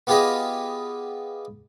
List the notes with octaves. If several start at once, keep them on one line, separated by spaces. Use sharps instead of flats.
B3 F4 G4 G#4 B4 D#5